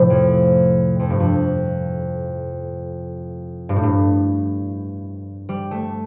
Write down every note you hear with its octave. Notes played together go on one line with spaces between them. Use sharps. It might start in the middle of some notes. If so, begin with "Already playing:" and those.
Already playing: A2 C3 F3
F2
F2
G2
F2
G2
A2
G2
G3
A3